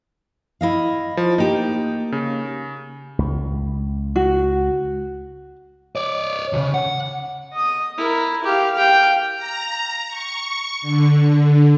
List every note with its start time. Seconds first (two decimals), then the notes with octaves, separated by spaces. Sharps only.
0.61 E4 D#5 F5
1.17 F3
1.38 A#3 D#4 G4
2.12 C#3
3.19 C#2
4.16 F#4
5.96 C#5 D5
6.53 D2 C#3
6.74 F#5
7.53 D#5 D#6
7.98 E4 A#4
8.44 G4 F5
8.74 F5 G5
9.36 A#5
10.08 C#6
10.82 D3